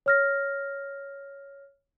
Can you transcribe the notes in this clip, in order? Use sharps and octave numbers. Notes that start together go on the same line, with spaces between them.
C#5 F6 A#6